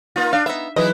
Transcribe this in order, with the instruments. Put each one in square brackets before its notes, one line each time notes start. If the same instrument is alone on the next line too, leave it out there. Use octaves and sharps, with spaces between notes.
[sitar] A#3 D#4 F4
[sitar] D4 [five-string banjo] F5
[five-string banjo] B3 D#4 [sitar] E5
[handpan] E3 F#3 B4 [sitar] G#3 D#4 E4 [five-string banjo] D#5